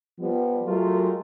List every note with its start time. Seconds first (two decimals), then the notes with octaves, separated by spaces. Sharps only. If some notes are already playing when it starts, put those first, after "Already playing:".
0.19 F3 G3 B3
0.65 F#3 G#3 A3 F4 G4 A#4